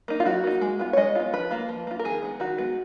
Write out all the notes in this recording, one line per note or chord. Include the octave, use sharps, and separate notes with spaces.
A#3 D#4
F4
F#3 F#4
A#3 D#4
G#3
B3 F4
C#5
G#3 D#5
B3 F4
F3 B4
A#3 F4
F3
A#3 F4
A#4
D#3 G#4
G#3 B3
D#3 F#4
G#3 B3